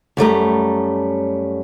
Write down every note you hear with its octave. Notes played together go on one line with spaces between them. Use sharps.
F#2 G3 A3 A#5